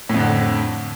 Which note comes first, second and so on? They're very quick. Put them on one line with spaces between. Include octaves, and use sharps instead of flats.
A2 F2 D3